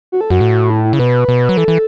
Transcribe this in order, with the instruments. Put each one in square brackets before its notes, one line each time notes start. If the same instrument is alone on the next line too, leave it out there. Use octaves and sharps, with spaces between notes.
[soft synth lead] F#4
A4
[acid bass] F#2 [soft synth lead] F#4
[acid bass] A2
[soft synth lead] E4
E4
[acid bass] C#3
[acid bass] B2 [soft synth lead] B4
[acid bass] B2
F#3
[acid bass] E3 [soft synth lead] A4
[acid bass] E3